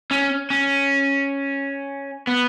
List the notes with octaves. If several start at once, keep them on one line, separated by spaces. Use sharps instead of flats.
C#4
C#4
B3